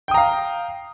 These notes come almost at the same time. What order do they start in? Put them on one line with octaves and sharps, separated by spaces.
G5 D#6 A#5 F5